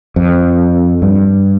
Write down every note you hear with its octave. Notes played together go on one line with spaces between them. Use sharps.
F2
G2